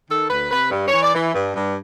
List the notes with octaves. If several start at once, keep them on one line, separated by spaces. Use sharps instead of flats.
D#3 A4
D2 B4
C3 B4
G2
C#5
E3
D5
E3
G2
G2